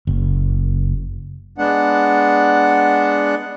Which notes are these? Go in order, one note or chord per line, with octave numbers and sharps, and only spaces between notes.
F#1
G#3 B3 D4 F#5